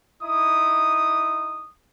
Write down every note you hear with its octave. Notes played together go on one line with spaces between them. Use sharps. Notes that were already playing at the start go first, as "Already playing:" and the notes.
D#4 E4 D#6